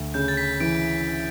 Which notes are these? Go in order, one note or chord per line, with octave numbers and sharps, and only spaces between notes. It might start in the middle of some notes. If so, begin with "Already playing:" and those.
Already playing: D2
C#3 G6
A6
B6
E3 D7